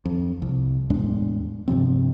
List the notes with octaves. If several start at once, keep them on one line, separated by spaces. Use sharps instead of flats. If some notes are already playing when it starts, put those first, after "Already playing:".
F2
C2
E2 A2 G#3 D4
G2 C3 F3 C4